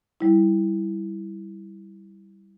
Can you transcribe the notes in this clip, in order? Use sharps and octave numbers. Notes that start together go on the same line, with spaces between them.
G3 E4